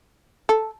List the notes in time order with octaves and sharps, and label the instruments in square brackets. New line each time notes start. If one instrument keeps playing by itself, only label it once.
[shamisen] A4